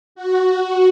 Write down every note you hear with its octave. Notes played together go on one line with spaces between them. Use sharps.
F#4